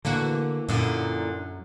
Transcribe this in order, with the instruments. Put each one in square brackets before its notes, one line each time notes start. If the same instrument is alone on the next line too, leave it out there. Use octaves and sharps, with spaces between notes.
[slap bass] D3 [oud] E3 A#3 F#4
[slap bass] F#2 [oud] A#2 D3 E4